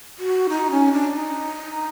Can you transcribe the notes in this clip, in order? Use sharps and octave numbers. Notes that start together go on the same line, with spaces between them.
F#4
D#4
C#4
D4
D#4